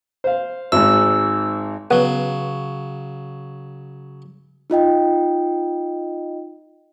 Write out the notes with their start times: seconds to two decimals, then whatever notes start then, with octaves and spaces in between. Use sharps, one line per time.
0.24 C5 F5
0.72 G#1 G#2 E6
1.91 C#3 F#3 B3
4.70 D#4 F4 D#5 G5